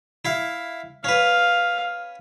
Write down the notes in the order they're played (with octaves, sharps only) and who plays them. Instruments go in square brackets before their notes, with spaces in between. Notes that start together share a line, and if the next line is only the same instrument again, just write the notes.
[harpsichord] E4 F5
[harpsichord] C#4 B4 [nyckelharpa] F5